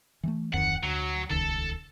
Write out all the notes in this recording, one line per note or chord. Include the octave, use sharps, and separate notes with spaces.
E3 G#3 A3
D1 F2 D#3 F#5
D2 F#3
D#1 C#2 D#3 A4